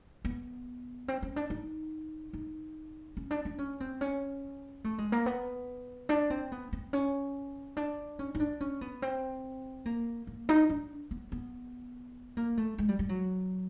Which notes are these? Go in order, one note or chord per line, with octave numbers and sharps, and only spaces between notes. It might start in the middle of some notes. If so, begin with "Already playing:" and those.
B3
C4
C#4
D4
D#4
D#4
C#4
D4
D4
C#4
C4
C#4
A3
G#3
A#3
B3
D4
C4
B3
C4
C#4
D4
C#4
D#4
D4
C#4
B3
C4
A#3
A#3
D#4
D4
B3
B3
A#3
A3
G#3
G3
G3
F#3